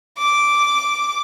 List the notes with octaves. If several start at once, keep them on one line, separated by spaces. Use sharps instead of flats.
D6